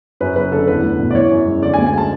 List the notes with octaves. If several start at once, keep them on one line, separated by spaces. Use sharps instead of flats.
F#2 B4
F#1 B4
D3 A4
E2 B4
A3
B2
D5
E3 C#5
F#2
G#3
D3 D5
G#5
D2
G#5
G#3 A5